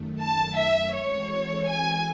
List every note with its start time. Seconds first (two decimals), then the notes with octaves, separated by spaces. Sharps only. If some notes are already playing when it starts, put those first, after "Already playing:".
Already playing: F#2 D#3 A3
0.20 A5
0.56 E5
0.94 E3 G#3 C4 F#4 A4 C#5
1.68 G#5